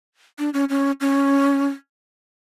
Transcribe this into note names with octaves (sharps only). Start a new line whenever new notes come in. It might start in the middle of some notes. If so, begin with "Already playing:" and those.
D4
C#4
C#4
C#4